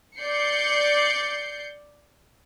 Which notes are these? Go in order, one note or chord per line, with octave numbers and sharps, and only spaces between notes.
D5 G6 C7 C#7